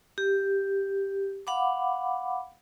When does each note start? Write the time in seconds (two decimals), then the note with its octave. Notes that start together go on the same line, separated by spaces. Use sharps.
0.18 G4
1.47 F5 F#5 B5 D6